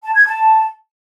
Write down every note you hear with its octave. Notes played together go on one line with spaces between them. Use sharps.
A5
G#6
A5